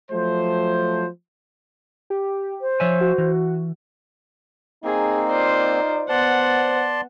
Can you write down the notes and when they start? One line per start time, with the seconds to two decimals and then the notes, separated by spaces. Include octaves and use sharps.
0.11 F3 F#3 A3 C5
2.10 G4
2.61 C5
2.80 F3 C#5 E5 G#5
3.01 F#4
3.18 E3
4.84 A#3 C4 D#4 G#4
5.29 F4 C5 D5
6.09 B3 C5 D5 F#5 A5 C6